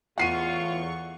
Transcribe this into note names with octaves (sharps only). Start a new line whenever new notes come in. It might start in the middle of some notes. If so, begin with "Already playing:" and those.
E2 A2 F4 F#5 C#6 C7 D#7